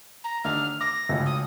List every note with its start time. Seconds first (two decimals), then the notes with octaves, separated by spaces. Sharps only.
0.24 A#5
0.44 D#2 D3 A3 F6
0.81 D6 A#6
1.09 G#1 C#2 A3
1.26 D#6